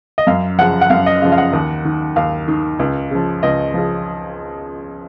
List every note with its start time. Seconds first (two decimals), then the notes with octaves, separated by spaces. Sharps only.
0.18 D#5
0.27 F#2 F5
0.58 C#3 F3 F#5
0.81 F#5
0.90 F#2 F5
1.06 D#5
1.22 C#3 F3 F5
1.32 F5
1.38 F#5
1.53 D#2
1.85 D#3
2.16 D#2 F5
2.48 D#3
2.79 C#2
3.11 C#3 F3
3.43 C#2 D#5
3.74 C#3 F3